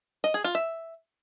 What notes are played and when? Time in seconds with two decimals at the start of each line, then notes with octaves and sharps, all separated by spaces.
0.24 D#5
0.34 G#4
0.44 F4
0.55 E5